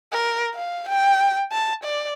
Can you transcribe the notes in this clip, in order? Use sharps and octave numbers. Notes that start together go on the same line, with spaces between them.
A#4
F5
G5
A5
D5